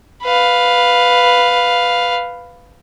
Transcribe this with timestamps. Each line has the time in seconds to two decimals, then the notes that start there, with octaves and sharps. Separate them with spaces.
0.23 B4 F5